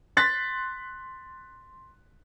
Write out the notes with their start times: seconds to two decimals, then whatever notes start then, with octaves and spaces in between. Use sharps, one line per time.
0.17 C6 F#6 A6 B6